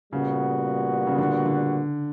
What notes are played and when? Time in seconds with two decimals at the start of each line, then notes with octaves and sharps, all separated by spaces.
0.12 A#2 C#3 G3 B3 F#4
1.07 C#3
1.18 D3
1.46 D3